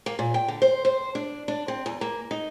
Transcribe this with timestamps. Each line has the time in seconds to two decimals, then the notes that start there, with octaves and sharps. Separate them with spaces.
0.06 A#3
0.19 A#2
0.34 G5
0.48 D3
0.62 C5
0.85 C5
1.15 D4
1.48 D4
1.68 C4
1.86 E2
2.01 A#3
2.31 D#4